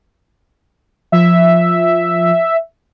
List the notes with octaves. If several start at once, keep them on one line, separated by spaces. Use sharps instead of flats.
F3 E5